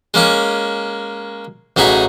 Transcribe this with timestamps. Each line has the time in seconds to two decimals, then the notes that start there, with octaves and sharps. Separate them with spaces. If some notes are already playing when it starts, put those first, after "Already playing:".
0.14 G#3 A#3 C#4 D6
1.76 A1 F#3 D#4 G#4 B5